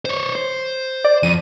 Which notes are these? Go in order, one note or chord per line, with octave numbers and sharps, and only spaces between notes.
C5 C#5
C5
D5
F2 D#7